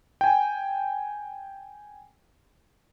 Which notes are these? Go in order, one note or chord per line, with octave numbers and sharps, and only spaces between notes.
G5 G#5